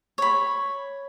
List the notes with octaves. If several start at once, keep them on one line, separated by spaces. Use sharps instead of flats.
C#5 B5